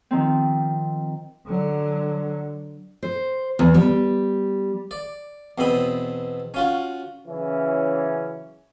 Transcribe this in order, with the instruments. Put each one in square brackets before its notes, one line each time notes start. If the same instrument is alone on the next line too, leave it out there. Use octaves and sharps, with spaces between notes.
[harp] D#3 F3 C4
[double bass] D3 F#3
[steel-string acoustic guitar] C5
E2
G3
[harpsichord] D5
E2 B2 C4 B5 D#6
C#4 F4 F#4
[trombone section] C#3 E3 F#3 C#4 E4